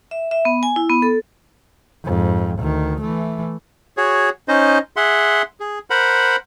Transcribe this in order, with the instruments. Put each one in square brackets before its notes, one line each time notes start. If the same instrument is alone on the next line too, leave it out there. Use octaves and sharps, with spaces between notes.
[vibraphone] E5
E5
B3
G#5
E4
B3
A4
[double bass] F2 G#2
D2 D#3
E3 A3
[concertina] F#4 G#4 C#5
C#4 D#4 C5 D#5
G#4 E5 F#5 C6
G#4
A#4 C5 F#5 B5